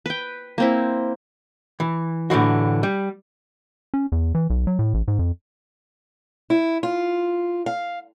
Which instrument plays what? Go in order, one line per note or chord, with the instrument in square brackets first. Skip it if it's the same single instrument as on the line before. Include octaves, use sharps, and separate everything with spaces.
[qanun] B4 G5
A#3 C4 E4
[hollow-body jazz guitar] E3
A2 D3 E3 F#4
G3
[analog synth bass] C#4
E2
E3
B1
F#3
A2
A1
G#2
F2
[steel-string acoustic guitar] E4
F4
F5